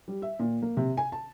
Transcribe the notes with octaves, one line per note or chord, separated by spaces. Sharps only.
G3
E5
A#2
A#3
C3
G#5
A5